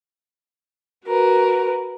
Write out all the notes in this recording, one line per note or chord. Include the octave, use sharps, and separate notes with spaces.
F#4 A#4 B4